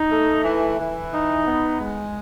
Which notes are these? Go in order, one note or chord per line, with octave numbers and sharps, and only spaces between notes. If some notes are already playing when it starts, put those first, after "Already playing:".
Already playing: D#4
A3
E3
E3
D#4
B3
G#3